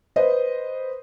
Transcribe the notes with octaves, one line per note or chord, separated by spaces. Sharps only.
B4 C5 D#5